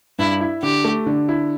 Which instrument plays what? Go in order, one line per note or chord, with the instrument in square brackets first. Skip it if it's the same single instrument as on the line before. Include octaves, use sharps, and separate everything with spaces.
[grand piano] G2 [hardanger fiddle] E4
[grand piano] E4
[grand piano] D3 [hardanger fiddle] G4
[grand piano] A3
D3
E4